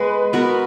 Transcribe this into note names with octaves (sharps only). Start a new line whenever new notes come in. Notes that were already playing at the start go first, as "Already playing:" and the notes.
Already playing: G#3 B3 B4
B3 F#4 A#4